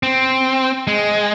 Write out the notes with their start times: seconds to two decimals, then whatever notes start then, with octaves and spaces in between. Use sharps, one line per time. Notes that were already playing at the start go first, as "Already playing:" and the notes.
0.03 C4
0.87 G#3